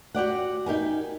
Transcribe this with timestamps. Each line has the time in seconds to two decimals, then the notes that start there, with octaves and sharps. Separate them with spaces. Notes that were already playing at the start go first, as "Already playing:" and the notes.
0.15 F#4 G4 D5 F#5
0.66 D#4 G4 A#4 G#5